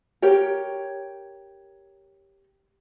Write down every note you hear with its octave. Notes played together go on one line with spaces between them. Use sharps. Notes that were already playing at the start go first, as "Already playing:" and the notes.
G4 A#4 C#5 G5